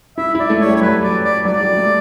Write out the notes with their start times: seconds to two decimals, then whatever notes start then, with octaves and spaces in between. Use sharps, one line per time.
0.18 E4 E5
0.35 E4 D5
0.50 A3
0.61 C#5
0.66 G3
0.76 C#5
0.81 F#3 B4
1.03 D5
1.24 D5
1.45 F#3 D5
1.61 G3
1.77 A3